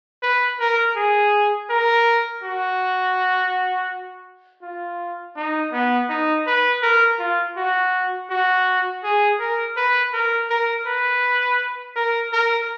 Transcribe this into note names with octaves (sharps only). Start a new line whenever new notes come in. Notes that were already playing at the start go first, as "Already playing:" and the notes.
B4
A#4
G#4
A#4
F#4
F4
D#4
B3
D#4
B4
A#4
F4
F#4
F#4
G#4
A#4
B4
A#4
A#4
B4
A#4
A#4